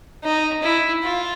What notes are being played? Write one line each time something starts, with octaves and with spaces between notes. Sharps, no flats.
D#4
E4
F4